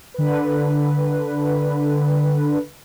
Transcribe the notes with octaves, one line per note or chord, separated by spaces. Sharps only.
D3 B4